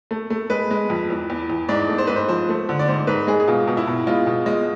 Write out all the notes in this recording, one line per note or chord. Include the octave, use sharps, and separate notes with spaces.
A3
A3
G#3 B4
G#3
F2
E2
E2
E2
G#2 D5
A3
C5
G#2 B4
C5
F3 C5
A3
D3
D5
G#2 C5
G#2 B4
G#3 G#4
G#4
B2 F4
B2
E4
B2
G#3 F4
B2
G#3